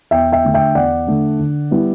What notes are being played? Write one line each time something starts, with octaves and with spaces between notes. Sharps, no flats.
E2 E5 G5
E5 G5
D3 A3 D4
E5 G5
E2 D5 F#5
D3 A3 D4
D3
G3 B3 E4